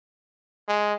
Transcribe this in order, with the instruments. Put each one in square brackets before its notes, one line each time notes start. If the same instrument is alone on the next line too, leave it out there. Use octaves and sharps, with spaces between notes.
[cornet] G#3